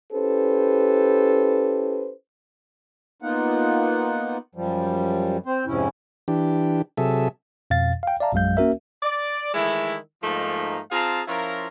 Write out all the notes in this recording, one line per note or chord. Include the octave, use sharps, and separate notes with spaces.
C#4 E4 G4 A4 B4 C5
A#3 B3 D#4 F4 F#5
F#2 F3 G3
C4 C5
F2 G#2 C3 C#4 E4
E3 D4 G4
C3 F#3 G#4 A4 E5
F2 B2 F5 A6
F5 G5
D5 E5 F5 A5 A#5
A#1 F#2 F#3 G#3 F5 G6
A#3 C#4 F#4 A#4 E5
D5
D#3 E3 G#3 A3 E4
G#2 F3 A3 A#3 D#4
C4 F4 G#4 F5 A5 A#5
F3 C#4 E4 F4 A#4